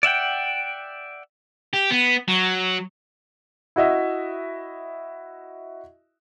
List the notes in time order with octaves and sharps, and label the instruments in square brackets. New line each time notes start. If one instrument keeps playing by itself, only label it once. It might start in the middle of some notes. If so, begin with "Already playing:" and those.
[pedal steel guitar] D5 E5 F#5 G5
[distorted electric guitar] G4
B3
F#3
[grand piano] E4 F#4 D#5 E5